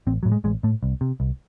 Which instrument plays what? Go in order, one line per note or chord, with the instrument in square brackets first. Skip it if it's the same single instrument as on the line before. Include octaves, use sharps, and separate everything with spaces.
[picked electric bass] A1 C4
A2 F#3
G#3
A1 G#3
A2 A3
C2
C3
C2